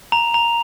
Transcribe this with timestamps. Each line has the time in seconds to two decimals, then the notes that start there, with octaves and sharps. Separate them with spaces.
0.12 A#5 F7
0.34 A#5 F7